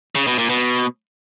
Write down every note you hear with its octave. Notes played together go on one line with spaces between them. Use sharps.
C#3
B2
A#2
B2